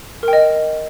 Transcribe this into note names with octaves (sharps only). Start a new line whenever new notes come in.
A#4 D#5 G5